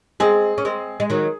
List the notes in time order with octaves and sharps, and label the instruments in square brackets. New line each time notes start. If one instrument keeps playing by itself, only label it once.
[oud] G#3 C4 [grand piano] G#4
[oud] C#4
G#3 C4
G#3
D#3 F#3